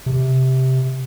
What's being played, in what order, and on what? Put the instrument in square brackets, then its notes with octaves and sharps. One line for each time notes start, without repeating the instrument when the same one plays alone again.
[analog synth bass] C3